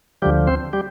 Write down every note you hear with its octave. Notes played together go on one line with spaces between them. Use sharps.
D2 D3 F3 G3 G4
C4 C5
G3 G4